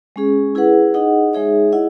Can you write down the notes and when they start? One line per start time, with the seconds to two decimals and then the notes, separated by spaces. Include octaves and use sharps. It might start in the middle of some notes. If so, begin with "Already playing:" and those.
0.16 G#3 C#4 G#4
0.55 E4 G#4 B4 F#5
0.94 D#4 G#4 D#5 F#5
1.33 G#3 D#4 G#4 C#5 E5
1.72 E4 G#4 D#5 F#5